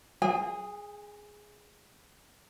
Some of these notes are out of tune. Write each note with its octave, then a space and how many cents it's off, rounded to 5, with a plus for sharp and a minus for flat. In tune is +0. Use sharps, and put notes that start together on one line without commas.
G#4 +0 G#5 -40